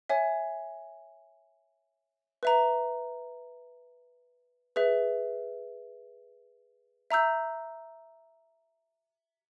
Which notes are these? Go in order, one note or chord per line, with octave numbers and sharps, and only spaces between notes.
C#5 E5 G#5
B4 E5 A#5
G#4 B4 E5
E5 A#5 E6 G6